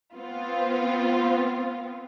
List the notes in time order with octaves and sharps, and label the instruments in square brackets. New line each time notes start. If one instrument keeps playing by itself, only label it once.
[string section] B3 C4 F4